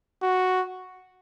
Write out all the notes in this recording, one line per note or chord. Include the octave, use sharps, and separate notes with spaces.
F#4